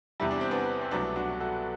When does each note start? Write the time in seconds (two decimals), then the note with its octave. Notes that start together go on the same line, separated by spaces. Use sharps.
0.20 E2 C3 E3 G3 E4
0.31 D4
0.41 C4
0.51 B3 D4
0.82 C4
0.91 C2 B2 F#3 A3 B3 D4
1.16 D4 F#4
1.40 F#4 A4